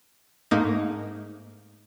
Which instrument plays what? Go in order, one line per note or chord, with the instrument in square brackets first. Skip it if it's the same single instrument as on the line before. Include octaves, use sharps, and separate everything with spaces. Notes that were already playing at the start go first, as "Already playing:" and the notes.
[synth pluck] G#2 A3 A#3 D#4